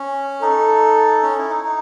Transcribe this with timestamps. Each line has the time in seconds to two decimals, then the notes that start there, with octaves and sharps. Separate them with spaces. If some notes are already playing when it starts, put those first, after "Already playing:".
Already playing: C#4
0.42 D#4 A4
1.23 C#4
1.38 E4
1.51 D#4
1.65 D#4